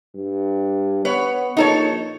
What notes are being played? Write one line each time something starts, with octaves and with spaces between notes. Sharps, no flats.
G2
B3 B4 C#5
A#1 D#4 A4 C#5